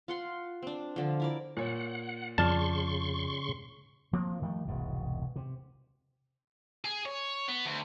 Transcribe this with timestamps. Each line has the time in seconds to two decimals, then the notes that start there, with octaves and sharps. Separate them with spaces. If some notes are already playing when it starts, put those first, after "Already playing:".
0.08 F4 F#5 C6
0.62 C4 D4
0.96 D3 F3
1.20 E4 A#4 D5
1.57 A#2 C#5 F#5
2.38 F2 C#3 F3 D5 A5 C6 C#6 F6
4.13 F3 A#3 C4
4.42 D#3 F3 G3 A3
4.68 E1 C2 G#2 B2
5.36 C3
6.84 G#4
7.05 C#5
7.49 B3
7.66 D2